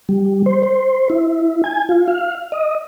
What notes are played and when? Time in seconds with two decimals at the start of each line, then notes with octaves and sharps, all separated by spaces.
0.09 G3
0.46 C5
0.63 C5
1.10 E4
1.64 G#5
1.89 F4
2.08 F5
2.52 D#5